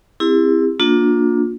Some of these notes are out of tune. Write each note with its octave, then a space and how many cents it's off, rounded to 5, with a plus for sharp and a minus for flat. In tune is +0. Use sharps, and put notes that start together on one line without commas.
C4 +0 E4 +5 G4 +45
A#3 +0 D4 +0 F4 +35